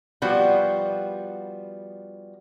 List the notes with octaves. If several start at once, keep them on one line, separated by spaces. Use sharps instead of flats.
F3 G3 B3 F#4 F#5